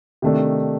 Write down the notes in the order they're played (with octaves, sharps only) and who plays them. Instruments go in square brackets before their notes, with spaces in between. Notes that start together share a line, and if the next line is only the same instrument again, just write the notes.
[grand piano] C3 D#3 A3 D4